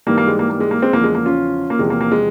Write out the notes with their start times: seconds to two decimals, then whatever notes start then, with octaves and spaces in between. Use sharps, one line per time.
0.07 G#2 E3 G3 A#3
0.18 A#3
0.28 G#3
0.39 A#3
0.50 A#3
0.61 G#3
0.71 A#3
0.82 G#3 C4
0.93 E2 C#3 F3 A#3
1.04 G#3
1.15 A#3
1.25 C#4 F4
1.70 A#3
1.79 E2 C3 F3 G#3
1.90 A#3
2.01 A#3
2.12 G#3